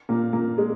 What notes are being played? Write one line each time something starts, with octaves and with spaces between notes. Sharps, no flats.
A#2 A#3
A#2 A#3
G#3